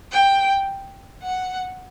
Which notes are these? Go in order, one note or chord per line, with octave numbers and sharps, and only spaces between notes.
G5
F#5